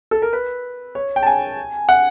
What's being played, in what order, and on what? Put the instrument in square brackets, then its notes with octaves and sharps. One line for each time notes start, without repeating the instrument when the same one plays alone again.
[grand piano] A4
A#4
B4
C#5
G5
A5
G#5
F#5